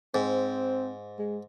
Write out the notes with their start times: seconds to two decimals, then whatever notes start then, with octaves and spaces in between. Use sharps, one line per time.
0.15 G#2 C4
1.19 G#3